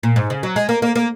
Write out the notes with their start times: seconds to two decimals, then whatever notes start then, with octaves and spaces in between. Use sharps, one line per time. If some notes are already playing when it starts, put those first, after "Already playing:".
0.03 A#2
0.16 G#2
0.30 C#3
0.43 F#3
0.56 G#3
0.69 A#3
0.82 A#3
0.95 A#3